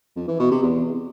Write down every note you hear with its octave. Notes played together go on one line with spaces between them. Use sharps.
F2
E3
B2
C3
E2